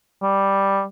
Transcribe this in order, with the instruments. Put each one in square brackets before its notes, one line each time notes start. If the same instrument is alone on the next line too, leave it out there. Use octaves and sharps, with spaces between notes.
[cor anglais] G3